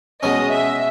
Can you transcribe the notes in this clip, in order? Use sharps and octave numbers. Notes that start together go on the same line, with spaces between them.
B2 G#3 C#4 D#5
E5